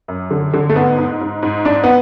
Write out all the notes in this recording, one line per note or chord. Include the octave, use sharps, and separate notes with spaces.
F#2
D3
D3
A3
G#2 B3
G#2
G#2
G#2
G#2 D4
B3